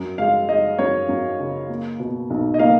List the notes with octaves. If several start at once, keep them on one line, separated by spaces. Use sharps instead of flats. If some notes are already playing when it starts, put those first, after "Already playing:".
Already playing: F#2
G#3 F5
G#3 D#5
F#2 C#5
F#2
C#3
A#3
B2
B1
D#5
A#3 F5